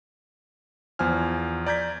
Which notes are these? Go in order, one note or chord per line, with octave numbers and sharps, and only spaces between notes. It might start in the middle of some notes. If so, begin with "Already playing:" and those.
E2 F3 C5 G#5 F6
D5 A#5 G6 G#6 B6